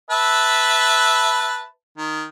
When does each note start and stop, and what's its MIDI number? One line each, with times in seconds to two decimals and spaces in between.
0.11 1.65 71
0.11 1.65 76
0.11 1.65 81
1.98 2.25 51